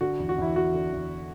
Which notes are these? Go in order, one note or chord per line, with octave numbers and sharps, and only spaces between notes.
D3 F#4
E2
F#4
E2 E4
E2 F#4
D3
E2